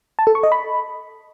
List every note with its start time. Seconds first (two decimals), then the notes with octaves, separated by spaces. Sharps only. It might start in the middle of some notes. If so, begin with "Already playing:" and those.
0.19 A5
0.27 A4
0.35 C#6
0.43 D#5
0.52 B5